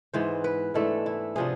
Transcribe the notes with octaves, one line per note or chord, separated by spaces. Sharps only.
G#2 E3 B3 C5
B4
G#2 E3 A3 D4 A4
E4
C3 F3 B3 D4 G#4